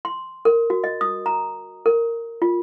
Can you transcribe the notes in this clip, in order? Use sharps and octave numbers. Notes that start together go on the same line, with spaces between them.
C6
A#4
F#4
D#5
D#6
A#5
A#4
F4